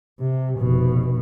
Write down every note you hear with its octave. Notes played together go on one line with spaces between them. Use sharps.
C3
F1 B2